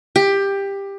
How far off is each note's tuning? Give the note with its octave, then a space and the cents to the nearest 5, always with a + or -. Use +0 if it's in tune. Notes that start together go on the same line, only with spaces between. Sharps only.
G4 +15